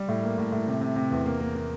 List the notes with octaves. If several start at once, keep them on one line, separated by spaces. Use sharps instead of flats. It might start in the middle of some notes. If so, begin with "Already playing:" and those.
Already playing: G3
A2
A#3
A2
A2
C3
C3
C3
E2
A#3
A#3
A#3